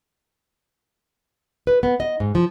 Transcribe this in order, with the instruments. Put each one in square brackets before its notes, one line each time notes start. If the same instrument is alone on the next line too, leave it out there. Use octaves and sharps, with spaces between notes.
[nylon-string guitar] B4
B3
D#5
G#2
F3